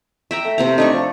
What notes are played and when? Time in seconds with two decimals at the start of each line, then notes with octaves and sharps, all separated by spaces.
0.31 E5 G5 A#5
0.45 A3
0.58 C3 C4 A#5
0.78 A3 D4 D#4 C#6
0.94 F3